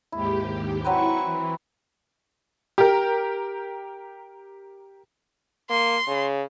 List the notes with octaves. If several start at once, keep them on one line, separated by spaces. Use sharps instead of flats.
D#2 G#2 E4 G4
F#3 C4 E4 B4 C#6
E3
G4 A#4
A#3 C6
C#3